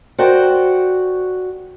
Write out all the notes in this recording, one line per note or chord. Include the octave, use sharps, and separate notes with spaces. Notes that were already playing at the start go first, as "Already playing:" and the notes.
F#4 A#4 C5 D5 G5